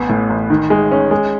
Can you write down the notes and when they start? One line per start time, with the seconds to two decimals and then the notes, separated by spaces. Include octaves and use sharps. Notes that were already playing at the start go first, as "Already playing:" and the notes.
Already playing: A1 B3
0.09 A2
0.30 A1
0.50 D#3
0.70 G#3
0.92 C#4
1.11 G#3